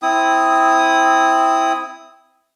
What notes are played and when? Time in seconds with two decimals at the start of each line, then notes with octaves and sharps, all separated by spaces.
0.02 C4 E4 D#6